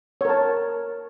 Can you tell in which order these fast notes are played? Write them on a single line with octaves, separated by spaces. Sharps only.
C#5 A#4 A5